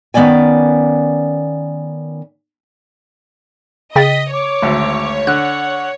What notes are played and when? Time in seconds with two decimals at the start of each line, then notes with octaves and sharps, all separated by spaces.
0.14 D#3 B3 C#4 D5 G#5
3.96 C#3 D#5 G5 A6 B6
4.33 C#5 D6
4.62 G#1 D2
5.27 D3 F#5 F#6